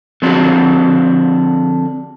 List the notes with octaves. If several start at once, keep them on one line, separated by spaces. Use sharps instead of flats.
D3 F3 C4 D4 F#4